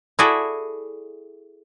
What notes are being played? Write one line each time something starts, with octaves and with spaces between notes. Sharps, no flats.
E4 F#4 G#4 A4 D5 E5